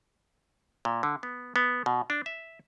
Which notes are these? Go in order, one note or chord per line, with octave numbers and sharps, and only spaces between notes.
A#2
D3
B3
B3
B2
D4
E5